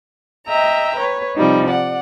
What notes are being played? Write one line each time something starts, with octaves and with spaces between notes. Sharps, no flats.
D#5 E5 G5 A#5
B4 C#5
C3 F3 G3 D#4
D5 F#5